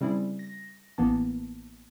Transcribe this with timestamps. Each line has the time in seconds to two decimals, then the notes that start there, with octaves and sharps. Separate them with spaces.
0.01 C#3 G3 C4 E4 G#4
0.39 A#6
0.98 A1 E3 A#3 B3 A5